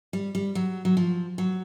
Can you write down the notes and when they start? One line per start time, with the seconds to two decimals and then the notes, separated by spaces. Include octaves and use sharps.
0.13 G3
0.35 G3
0.55 F#3
0.85 F#3
0.97 F3
1.38 F#3